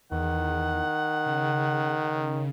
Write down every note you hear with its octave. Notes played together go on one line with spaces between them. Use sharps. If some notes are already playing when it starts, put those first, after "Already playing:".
E2 D#3 F#5
C#3